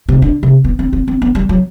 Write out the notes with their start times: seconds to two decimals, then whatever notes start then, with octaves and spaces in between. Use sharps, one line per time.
0.09 C3
0.22 D3
0.43 C3
0.64 B3
0.79 C4
0.93 C4
1.08 C4
1.22 B3
1.35 G3
1.49 F#3